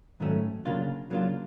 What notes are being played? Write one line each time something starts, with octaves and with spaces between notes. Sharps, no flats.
G#2 D#3 F#3 A3 C#4
C#3 F#3 A#3 D4 F4
C#3 F#3 A#3 D4 F4